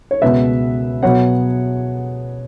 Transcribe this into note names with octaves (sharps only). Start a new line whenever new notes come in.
C#5
C#2 B2 B3 B4 E5
B2 F#3 B3 C#5 F#5